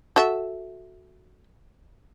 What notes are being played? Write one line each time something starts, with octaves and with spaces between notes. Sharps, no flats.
F#4 A4 E5